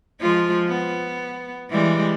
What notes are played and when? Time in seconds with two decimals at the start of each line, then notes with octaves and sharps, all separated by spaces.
0.20 F3 G#3 F4
0.68 B3
1.70 E3 G3 G#3